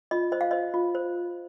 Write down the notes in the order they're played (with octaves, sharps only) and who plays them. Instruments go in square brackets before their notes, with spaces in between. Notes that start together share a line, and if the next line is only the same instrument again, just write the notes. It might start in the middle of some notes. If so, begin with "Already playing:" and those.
[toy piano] F4 D#5
C5 D#5
F5
C5 D#5
F4
C5